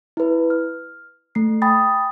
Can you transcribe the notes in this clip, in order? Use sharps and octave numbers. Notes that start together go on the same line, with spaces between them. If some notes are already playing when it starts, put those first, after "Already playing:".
E4 B4
F6
A3 C7
G5 G#5 B5 D#6 A6